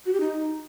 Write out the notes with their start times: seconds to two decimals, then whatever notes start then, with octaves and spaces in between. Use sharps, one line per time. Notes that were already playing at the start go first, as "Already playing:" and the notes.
0.06 F#4
0.13 G4
0.20 D#4